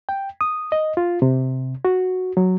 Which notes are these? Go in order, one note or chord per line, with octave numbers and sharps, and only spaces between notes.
G5
D#6
D#5
F4
C3
F#4
F#3